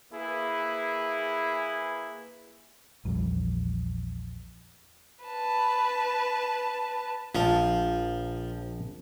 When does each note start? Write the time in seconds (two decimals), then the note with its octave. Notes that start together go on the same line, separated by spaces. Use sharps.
0.13 A#3 E4 G#4 B4
3.05 A#1 E2 F3 G3
5.25 B4 A5
7.35 A#1 F3 A5